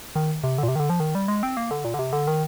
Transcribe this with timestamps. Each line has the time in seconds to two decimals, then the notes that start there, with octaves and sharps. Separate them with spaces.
0.16 D#3
0.44 C3
0.58 D3
0.63 A#2
0.68 C3
0.76 D#3
0.80 D3
0.90 F3
1.00 D#3
1.15 G3
1.28 G#3
1.43 C4
1.57 A#3
1.71 D3
1.85 A#2
1.94 D3
1.99 C3
2.13 D3
2.27 D#3